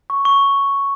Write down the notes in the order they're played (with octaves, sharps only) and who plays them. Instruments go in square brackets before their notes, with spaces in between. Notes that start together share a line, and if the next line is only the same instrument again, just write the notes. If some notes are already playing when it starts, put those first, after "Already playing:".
[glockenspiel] C#6
C#6